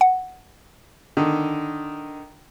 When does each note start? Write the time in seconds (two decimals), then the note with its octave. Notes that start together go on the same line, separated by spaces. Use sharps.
0.01 F#5
1.17 D3 D#3